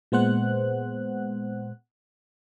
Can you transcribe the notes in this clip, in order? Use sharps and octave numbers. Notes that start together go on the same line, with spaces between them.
A#2 G#3 B3 C5 F#5 F#6